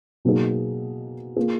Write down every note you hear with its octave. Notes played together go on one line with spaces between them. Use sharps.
B2 F#3 A#3 D#4 G#4
A#3 F4 G#4